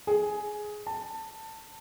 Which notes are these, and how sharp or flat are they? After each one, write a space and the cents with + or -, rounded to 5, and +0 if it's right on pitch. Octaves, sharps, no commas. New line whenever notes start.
G#4 +10
A5 +20